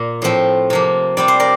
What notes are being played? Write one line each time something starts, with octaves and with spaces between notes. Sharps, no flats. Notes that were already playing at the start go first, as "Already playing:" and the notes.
Already playing: A#2 A#3
A2 F3 C4
C3 F3 A#3
C3 G3 C4 D5
C5
A#4 D5